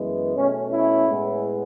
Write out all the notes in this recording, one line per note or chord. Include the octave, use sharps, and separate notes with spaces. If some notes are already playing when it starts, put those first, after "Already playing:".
Already playing: F#2 E3 G#3 B3
B2 A3 C#4
C#4 E4
A2 G#3 B3